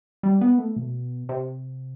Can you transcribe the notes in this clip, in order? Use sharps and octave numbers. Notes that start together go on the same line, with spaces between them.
G3
B3
A3
B2
C3